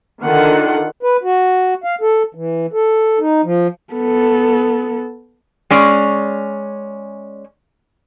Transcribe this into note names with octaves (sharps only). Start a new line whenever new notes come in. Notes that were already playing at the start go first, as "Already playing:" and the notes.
D3 D#3 F4 F#5
B4
F#4
F5
A4
E3
A4
D#4
F3
B3 A4
G#3 C#4 D5